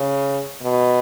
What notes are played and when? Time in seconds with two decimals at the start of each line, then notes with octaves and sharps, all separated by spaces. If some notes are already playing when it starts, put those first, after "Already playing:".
Already playing: C#3
0.63 B2